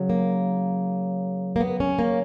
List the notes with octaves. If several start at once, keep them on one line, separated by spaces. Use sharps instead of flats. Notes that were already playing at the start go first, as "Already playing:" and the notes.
Already playing: C#3 F#3
A#3
A#3
B3
C#4
A#3